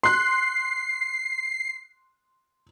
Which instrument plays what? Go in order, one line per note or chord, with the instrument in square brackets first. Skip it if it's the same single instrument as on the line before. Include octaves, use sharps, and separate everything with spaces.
[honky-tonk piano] C6 F#6 [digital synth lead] C7